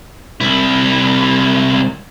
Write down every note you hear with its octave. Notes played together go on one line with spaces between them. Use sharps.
C2 E4